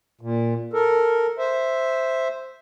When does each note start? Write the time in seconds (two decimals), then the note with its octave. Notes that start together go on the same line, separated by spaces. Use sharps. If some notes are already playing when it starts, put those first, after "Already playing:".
0.21 A#2
0.73 A4 A#4
1.38 C5 E5